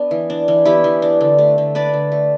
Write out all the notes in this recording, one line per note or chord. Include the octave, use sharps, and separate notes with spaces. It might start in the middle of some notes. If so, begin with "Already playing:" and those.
Already playing: B3 D4
E3
D4
E3
B3 E4 G4
E3
D4
D3
A3
D3
D4 B4 D5
D3
A3